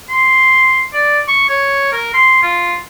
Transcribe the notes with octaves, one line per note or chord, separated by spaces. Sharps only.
C6
D5
C#6
C#5
A#4
C6
F4